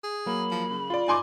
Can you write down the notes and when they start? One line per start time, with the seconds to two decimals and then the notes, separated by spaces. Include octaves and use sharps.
0.04 G#4
0.26 F#3 A#3 B5
0.51 F3
0.70 C#3
0.90 F4 D5
1.08 D#4 G#5 C6 D6